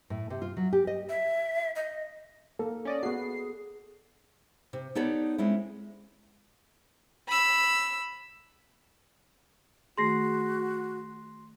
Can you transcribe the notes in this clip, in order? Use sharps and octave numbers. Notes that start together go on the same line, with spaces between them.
A2
C3
F4
F#3
G4
D#5
E5
D#5
A#3 A4
C#4 D5 D#5
B3 F#4 G#4 C7
C3
B3 D#4 G4 A4 C#5 D5
G#3 C4 C#4 E4
B5 E6
D#3 A3 F#4 G#4 C6 A#6 C7